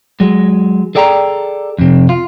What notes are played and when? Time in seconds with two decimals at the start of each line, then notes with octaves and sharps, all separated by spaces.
0.20 F#3 G#3
0.95 G#4 A4 D5 G5 G#5 A#5
1.79 F2 C3
2.09 F4